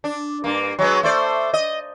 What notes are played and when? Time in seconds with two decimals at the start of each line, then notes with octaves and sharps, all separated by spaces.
0.04 D4
0.44 G2 A#3
0.79 F#3 G#3 B3
1.03 A3 C5 D5
1.53 D#5